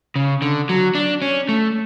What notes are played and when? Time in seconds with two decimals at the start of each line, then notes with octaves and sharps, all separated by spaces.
0.16 C#3
0.42 D3
0.69 F#3
0.95 D4
1.22 C#4
1.49 A3